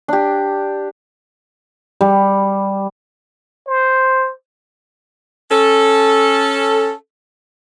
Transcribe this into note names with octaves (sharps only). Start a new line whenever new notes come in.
D4 G4
G3
C5
C#4 A4